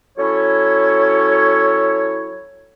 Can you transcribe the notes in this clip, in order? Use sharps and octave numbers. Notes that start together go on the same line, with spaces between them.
F#3 C#4 E4 A4 C#5